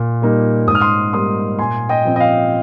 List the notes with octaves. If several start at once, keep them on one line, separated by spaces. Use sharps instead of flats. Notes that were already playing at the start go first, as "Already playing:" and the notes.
Already playing: A#2
G3 A#3 D#4
G#2 D#6
F6
C6 D#6
G3 A#3 D#4 C6 D#6
A#2 G#5 C6
D#5 G5
F3 C4
D#5
F5